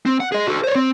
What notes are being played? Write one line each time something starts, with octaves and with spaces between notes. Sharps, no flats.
C4
F#5
G#4 D#5
F#4 A4
C5 C#5
C4